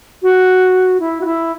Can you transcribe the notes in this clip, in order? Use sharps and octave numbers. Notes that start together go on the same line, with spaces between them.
F#4
E4
F#4
E4